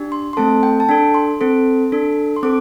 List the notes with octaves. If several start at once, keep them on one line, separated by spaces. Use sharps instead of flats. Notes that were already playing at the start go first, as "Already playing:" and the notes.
Already playing: D4 G4
C6
C6
A3 C4 A4 A5
G5
A5
D4 A4 G5
C6
C4 A4
D4 A4
C6
C4 A4 D6